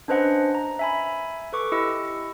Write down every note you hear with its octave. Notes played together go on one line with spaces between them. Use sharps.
C#4 D4 B4 C5 D#5 F#5
A#5
E5 G#5 B5
A4 B4 C#6 D6
E4 G4 D#5 E6 C#7